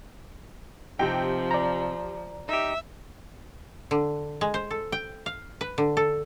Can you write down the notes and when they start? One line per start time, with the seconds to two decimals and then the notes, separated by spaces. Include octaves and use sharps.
0.99 C3 F3 C4 D#4 G4 G5
1.51 D5 A#5
2.49 D#4 G4 E5
3.91 D3
4.41 G#3
4.54 C5
4.71 A4
4.92 G5
5.26 F5
5.61 B4
5.78 D3
5.97 A4